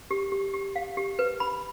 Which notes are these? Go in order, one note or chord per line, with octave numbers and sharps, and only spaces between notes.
G4
G4
G4
F5
G4
B4
B5